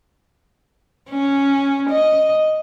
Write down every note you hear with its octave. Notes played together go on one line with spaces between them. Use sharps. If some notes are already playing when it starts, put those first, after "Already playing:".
C#4
D#5